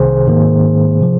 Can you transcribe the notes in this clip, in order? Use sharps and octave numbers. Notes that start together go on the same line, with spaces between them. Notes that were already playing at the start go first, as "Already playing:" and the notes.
Already playing: C2 C3 D#3 G#4 C5
G#2 D#3 A#3
C3 F3